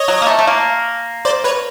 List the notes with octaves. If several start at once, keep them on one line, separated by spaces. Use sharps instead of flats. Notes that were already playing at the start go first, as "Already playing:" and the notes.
Already playing: C#5 D#5
F#3
A#3
A3
A3
A#3
C5 D5
B4 C#5